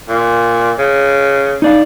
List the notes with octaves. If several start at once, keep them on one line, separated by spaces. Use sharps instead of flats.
A#2
C#3
D#4 D5 F5